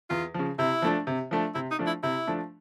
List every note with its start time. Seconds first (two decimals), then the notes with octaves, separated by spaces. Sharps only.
0.10 E2 F4
0.34 C#3 F3
0.59 C3 E4
0.82 F3 A3 D4
1.07 C3
1.31 F3 A3 D4
1.54 C3 E4
1.71 D#4
1.79 F3 A3 D4
1.87 E4
2.03 C3 E4
2.27 F3 A3 D4